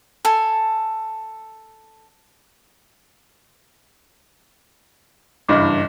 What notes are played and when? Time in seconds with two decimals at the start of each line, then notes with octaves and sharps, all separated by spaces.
0.25 A4 G#5
5.49 F#1 G2 E3 D#5 D6